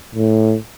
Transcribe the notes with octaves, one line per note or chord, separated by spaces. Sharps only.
A2